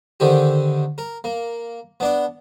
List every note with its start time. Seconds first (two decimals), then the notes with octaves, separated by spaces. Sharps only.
0.20 D3 D#3 C4 G4
0.98 A#4
1.24 A#3
2.00 B3 D4 D5